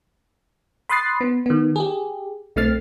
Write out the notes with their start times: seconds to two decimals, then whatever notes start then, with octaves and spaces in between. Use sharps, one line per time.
0.89 B5 C6 D#6 F#6 A6 C7
1.21 B3
1.46 D#3 B3
1.76 G4 G#4
2.56 B1 A3 C4 F6 A6 C7